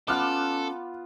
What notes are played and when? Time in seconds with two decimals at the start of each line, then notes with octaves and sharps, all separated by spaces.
0.08 B3 C#4 F4 A4 D6 F6 F#6